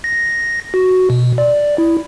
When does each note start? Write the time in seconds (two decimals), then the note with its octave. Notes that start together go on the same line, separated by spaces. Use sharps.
0.04 A#6
0.74 F#4
1.10 B2
1.38 D5
1.78 E4